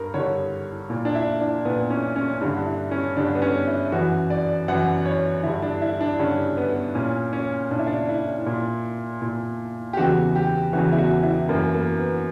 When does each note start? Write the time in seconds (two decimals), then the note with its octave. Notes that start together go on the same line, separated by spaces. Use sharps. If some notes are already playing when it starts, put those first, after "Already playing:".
Already playing: G2 A#4
0.14 G2 D3 C#5
0.90 A#2
1.05 D4
1.15 E4
1.40 D4
1.65 A#2 B3
1.90 C#4
2.16 C#4
2.41 G2 D3 D4
2.66 E4
2.91 C#4
3.17 G2 D3 D4
3.35 B3
3.42 C#4
3.67 E4
3.92 F#2 E3 F#4
4.30 D5
4.68 F#2 E3 F#5
5.06 C#5
5.43 G2 D3 E4
5.62 D4
5.82 E4
6.01 D4
6.19 G2 D3 C#4
6.57 B3
6.95 A#2 C#4
7.33 C#4
7.71 A#2 D4
7.79 E4
7.87 D4
8.08 E4
8.46 A#2
9.22 A#2
9.93 G4
9.97 E2 C#3 E3 F#4
10.35 G4
10.73 E2 C#3 E3 F#4
10.92 E4
10.98 F#4
11.23 E4
11.49 F#2 E3 A#3
11.74 A#3
11.99 B3